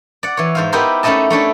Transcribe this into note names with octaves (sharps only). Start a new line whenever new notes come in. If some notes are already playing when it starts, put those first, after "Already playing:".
D5 F#5
E3 C#5
G#2 C5 F5
B3 D#4 E4 G4 A#4 C5
A3 C#4 D#4 E4 D#5 A5
A3 C#4 D4 E4